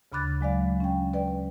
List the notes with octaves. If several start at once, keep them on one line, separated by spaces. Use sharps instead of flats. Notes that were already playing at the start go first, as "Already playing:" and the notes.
D2 C#3 B5 D6 F#6 A6
F#3 G#3 D5 F5
C#4 G5
B4 D5 G5